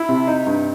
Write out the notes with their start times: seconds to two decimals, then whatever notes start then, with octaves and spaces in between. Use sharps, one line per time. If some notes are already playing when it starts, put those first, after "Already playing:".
Already playing: E4
0.09 C3
0.27 D#4
0.47 G2